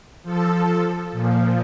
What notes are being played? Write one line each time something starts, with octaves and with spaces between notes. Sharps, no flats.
F3 A4
A#2 F3